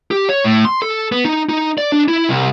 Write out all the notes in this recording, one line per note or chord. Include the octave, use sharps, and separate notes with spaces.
G4
C#5
A2
C6
A4
B3
D#4
D#4
D5
D4
E4
C2